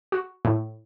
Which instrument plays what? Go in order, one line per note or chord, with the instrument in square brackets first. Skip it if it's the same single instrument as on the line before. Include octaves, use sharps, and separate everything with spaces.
[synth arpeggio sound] F#4
A2